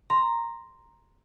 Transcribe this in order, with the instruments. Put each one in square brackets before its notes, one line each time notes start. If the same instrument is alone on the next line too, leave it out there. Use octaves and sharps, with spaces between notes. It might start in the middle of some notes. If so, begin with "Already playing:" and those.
[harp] A#5 [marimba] C6